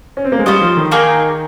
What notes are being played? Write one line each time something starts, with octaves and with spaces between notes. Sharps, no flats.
C#4
C4
A#3
G#3
G3 C#4 F4 C5 D#5
F3
D#3
A#3 D#4 G#4